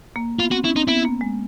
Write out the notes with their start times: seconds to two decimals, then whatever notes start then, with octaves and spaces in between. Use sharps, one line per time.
0.16 A#3
0.39 B3 F4
0.51 C4 F#4
0.64 C#4 E4
0.76 C4 D#4
0.88 B3 E4
1.05 A#3
1.21 G#3